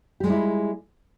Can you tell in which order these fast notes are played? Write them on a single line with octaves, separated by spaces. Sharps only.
G4 G#3 G3 E4 F4